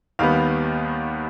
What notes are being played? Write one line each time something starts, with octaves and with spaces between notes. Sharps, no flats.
D#2 D#3 G3 B3 F5